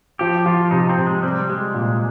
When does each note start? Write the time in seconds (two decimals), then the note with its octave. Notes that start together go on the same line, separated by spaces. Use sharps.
0.19 F3 G4
0.46 F3 F4
0.71 C3 D#4
0.89 C4
0.98 C3
1.07 G#3
1.23 G3 C4
1.49 G3 G#3
1.74 A#2